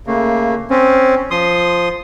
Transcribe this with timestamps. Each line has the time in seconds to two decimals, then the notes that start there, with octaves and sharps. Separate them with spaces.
0.07 C#3 A3 A#3
0.70 C4 C#4
1.31 F3 C6 D#6